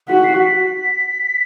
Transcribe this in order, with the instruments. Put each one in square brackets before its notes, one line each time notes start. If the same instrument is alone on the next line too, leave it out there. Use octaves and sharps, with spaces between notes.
[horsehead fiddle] F#4 [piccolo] B6
[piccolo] C7
B6